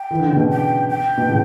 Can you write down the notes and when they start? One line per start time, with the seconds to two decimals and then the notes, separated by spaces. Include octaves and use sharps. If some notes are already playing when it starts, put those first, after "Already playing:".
Already playing: G5
0.11 E3
0.20 D3
0.28 C#3
0.36 B2 D3
0.50 G5
0.89 G5
1.17 B2
1.28 A2 C#3